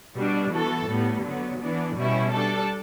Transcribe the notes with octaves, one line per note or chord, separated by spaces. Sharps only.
B2 G3 D4
E3 B3 F#4 A4
A2 G3 B3
D3 F#3 B3
E3 B3 D4
B2 G3 C#4 E4
G3 D4 A4